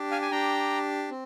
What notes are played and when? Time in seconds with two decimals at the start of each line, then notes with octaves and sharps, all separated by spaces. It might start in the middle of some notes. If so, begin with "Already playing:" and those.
Already playing: D4 G4
0.11 F5 G#5
0.22 G#5
0.31 D4 G4 G5 A#5
1.10 C4